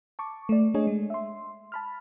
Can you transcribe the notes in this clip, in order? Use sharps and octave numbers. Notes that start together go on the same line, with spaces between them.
A5 C#6 D6
A3 D5
A3 D4 G#4 C#5 D#5 G#5
G#3
E5 C6
A5 B5 F6